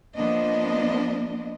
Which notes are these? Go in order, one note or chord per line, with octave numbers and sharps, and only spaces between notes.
F3 A#3 B3 D4 D#5